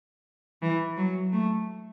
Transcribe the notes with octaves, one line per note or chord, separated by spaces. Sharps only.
E3
F#3
A3